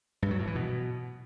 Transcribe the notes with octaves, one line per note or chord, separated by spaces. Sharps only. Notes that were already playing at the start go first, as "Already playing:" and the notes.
G2
F#3
A2
E3
B2